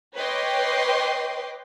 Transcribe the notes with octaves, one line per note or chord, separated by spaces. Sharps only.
B4 C#5 D#5 G5 C6 D6